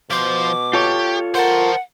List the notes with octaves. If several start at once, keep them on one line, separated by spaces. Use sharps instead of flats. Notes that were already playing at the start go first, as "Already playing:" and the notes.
B2 F3 C5 D6
F4 G4 A4 C#5
A#4 C5 F#5 A5